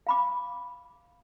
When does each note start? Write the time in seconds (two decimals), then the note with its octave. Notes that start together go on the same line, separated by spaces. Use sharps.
0.07 F5 B5 D6